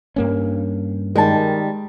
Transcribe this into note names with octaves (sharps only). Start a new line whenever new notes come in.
G2 A#3 C#4
D#3 G3 G#3 A5